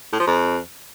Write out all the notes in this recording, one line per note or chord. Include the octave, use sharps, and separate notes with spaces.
A2
F3
F2